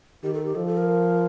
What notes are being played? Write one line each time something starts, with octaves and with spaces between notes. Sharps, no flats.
D#3 G4
A4
G4
F3 A4
A4
A#4